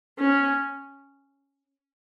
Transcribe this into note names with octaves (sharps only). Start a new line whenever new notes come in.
C#4